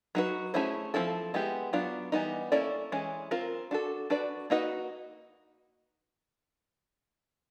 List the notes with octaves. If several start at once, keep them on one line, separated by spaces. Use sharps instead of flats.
F#3 B3 D#4 F#4 B4
A3 C#4 E4 G#4 C5
F3 A3 C4 E4 A4
G#3 B3 E4 G4
F#3 B3 D4 F4
E3 G3 B3 D#4
A#3 C#4 E4 A4 D5
E3 G#3 C#4
C4 F4 A#4
D4 F#4 A4
D4 F#4 B4 D5
A#3 D#4 F#4 B4 D#5